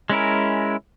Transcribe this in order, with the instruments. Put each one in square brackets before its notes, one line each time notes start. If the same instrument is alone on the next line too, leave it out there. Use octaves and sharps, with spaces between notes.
[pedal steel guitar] G#3 C#4 E4 A#4